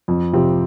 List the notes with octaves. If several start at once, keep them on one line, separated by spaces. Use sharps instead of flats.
F2
C3 F3 C4 G4